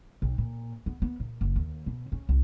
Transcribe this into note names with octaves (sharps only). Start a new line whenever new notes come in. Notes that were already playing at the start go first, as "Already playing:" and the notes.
B1
A#2
B3
B3
A#2
F#1
D#2
B2
C#4
C2